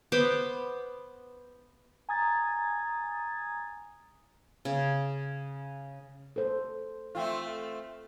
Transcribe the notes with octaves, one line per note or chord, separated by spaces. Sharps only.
B3 C5 B5 D6
G#5 A#5 D#6 G#6 A6
C#3
A4 C5
A3 C4 F4